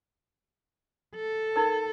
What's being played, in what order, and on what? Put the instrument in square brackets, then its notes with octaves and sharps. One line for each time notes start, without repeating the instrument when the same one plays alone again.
[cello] A4
[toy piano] D#4 A#4